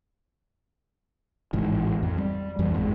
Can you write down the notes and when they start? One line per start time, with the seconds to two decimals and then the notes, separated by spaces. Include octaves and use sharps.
1.53 A1 G#2 D#3
2.03 F2
2.18 G3
2.59 F2 E3 G3
2.74 G#1 F2 G#2